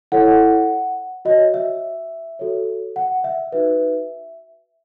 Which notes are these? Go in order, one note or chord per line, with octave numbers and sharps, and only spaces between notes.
E4 A4 C#5 F#5
F#4 C#5 D#5
E5
F#4 A4 C#5
F#5
E5
D#4 F#4 B4 E5